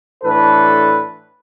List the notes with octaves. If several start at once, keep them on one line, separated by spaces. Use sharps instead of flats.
A2 E3 D4 A4 B4